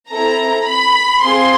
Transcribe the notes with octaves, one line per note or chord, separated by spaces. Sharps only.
C4 E4 A4 A#5
B5
C4 F4 G#4 C6